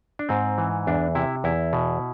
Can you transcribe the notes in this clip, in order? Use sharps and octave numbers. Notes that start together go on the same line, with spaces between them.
D4
G#2 C4
E3
E2 D4
C3 E4
E2 E4
B2